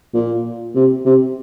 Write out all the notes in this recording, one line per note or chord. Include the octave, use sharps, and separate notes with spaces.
A#2
C3
C3